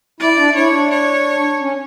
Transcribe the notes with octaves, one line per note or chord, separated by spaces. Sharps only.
E4 D5
E4
D4
E4 C#5
D4
C#5
C#4